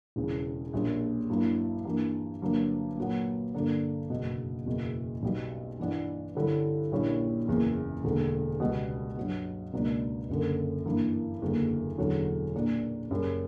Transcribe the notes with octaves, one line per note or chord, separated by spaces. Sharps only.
E1 E2 C#3 E3
A#1 A#2 G3 C#4
G2 F#3 A#3 E4
G2 E3 G3 A#3
G1 G2 F#3 A#3
A#2 F#3 B3
G2 D3 A#3 D4
F#1 E2 B2
F#1 E2 B2
B1 B2 G3
G2 E3 B3 D4
G2 D3 G3 C#4 E4
A#1 A#2 G3 C#4 E4
F#1 E2 C#3 E3 A#3
E1 E2 D3 A#3
C#2 B2 G3 B3
G2 F#3 B3
C#2 B2 A#3 D4
F#1 F#2 D3
G2 E3 A#3 E4
F#1 E2 D3 G3 A#3
E1 E2 D3 F#3 C#4
A#2 A#3 D4
F#1 F#2 C#3 G3 C#4